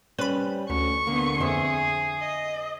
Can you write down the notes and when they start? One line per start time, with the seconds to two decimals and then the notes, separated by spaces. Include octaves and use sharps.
0.18 G3 C4 C#4 B4 B5
0.70 D2 C#4 C#6
1.07 D3 A#3 B3
1.40 F2 G#4 C5 E5
2.18 D#5